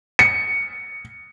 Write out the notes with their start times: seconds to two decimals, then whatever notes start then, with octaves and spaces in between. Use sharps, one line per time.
0.19 C#7